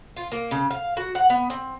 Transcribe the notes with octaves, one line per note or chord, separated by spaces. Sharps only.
F4
A#3
C#3
F5
F#4
F#5
B3
C4